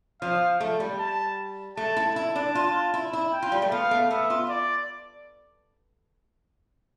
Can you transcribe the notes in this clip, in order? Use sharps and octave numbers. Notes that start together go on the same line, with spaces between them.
F3 F5
A3
G3
A5
A3 A5
E4
E4 A5
D4
F4
E4
E4
G5
F4
G3
A3
B3 F5
A3
B3 E5
F4
D5